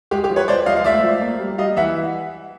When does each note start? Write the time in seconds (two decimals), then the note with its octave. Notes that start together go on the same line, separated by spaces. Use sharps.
0.11 G#3 G4
0.24 G4
0.30 F3
0.36 B4 C#5
0.48 G#3 C5 D5
0.66 F3 D#5 F5
0.76 F5
0.84 A3 D5 E5
1.04 F3
1.21 A#3
1.40 G3
1.58 G3 D#5 F5
1.77 E3 E5 F#5